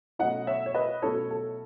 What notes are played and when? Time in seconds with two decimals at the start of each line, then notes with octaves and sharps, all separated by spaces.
0.19 B2 F#3 A3 C#4 E4 D#5 F#5
0.47 C#5 E5
0.66 C#5
0.75 B4 D#5
1.02 B2 F#3 A3 C#4 E4 A4 C#5
1.31 A4